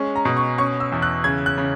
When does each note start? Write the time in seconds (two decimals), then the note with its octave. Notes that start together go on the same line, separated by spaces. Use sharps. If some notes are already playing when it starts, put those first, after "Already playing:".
Already playing: G#3 C#4
0.16 A#5
0.25 B2
0.37 C#6
0.58 C#4 C#6
0.80 E6
0.92 E2
1.02 F#6
1.24 C#3 G#6
1.46 F#6
1.58 C#3